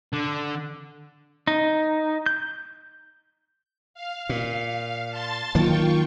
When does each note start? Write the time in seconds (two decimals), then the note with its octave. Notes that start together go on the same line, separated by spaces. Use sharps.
0.13 D3
1.47 D#4
2.26 G6
3.94 F5
4.29 A#2
5.10 A5 C6 A6
5.55 D#3 F#3 A#3 F4 G5 C#6